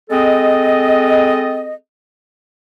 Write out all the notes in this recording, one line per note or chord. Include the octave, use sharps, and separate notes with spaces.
G#3 C4 A4 D#5